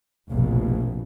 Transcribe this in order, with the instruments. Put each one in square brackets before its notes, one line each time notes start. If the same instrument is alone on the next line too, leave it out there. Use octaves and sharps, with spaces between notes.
[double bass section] F1 A#1 B2